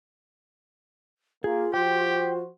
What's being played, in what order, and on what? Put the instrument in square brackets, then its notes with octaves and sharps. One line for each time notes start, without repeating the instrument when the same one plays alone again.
[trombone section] A#3 [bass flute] F4 [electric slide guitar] G#4
[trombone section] F3 F#4 C5 [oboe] G4 [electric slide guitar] G5